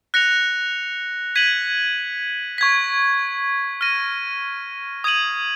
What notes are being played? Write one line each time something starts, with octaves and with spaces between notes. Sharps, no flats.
F#6 A#6 C#7 F7
G#6 B6 D#7 F#7
C#6 G#6 B6
F6 A#6 D#7
D#6 G#6 D#7 F#7